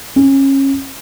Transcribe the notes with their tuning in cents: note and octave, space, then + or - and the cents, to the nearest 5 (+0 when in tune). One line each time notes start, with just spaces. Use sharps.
C#4 -25